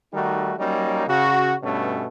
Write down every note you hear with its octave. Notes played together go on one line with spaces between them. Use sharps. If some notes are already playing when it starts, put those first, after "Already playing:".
D#3 G3 A3 D#4 F#4
F#3 G3 A#3 C#4 D#4
C#3 F#4
G2 B2 A3 C#4